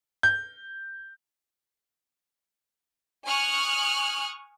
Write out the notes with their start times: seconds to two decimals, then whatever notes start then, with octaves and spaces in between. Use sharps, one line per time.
0.23 G6
3.26 G#5 C#6 D#6 F6 F#6